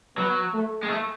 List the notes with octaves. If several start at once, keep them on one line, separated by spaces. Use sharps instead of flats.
F#3 B3
A3
G#3
A3